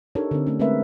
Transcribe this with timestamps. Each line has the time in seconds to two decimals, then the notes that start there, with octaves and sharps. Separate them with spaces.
0.15 D4 D#4 G4 A4 A#4 C#5
0.31 D3 C4
0.47 A3 C#4
0.59 G#3 A3 C4 A#4 B4 E5